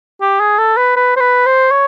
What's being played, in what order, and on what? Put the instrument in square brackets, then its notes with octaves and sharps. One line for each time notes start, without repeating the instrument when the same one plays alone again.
[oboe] G4
G#4
A4
B4
B4
C5
B4
C5
C#5